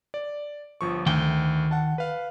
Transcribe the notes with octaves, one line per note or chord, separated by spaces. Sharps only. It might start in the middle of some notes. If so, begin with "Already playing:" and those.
D5
G1 F3 C#6
D2 D#3 G5
F#5 A5
B4 F5